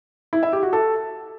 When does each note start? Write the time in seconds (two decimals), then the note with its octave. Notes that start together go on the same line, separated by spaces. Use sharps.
0.33 E4
0.43 E5
0.53 G4
0.63 F#4
0.73 A4